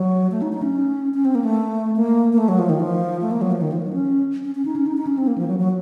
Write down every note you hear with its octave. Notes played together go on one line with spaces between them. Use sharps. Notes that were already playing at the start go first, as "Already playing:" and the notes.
Already playing: F#3
A3
D#4
D#4
C#4
C#4
C4
A#3
A3
A#3
A#3
A3
F#3
F3
D#3
F3
A3
A#3
F#3
F3
D#3
F3
F#3
C#4
C#4
C#4
D#4
C#4
D#4
D#4
C#4
C4
A#3
F3
F#3
F#3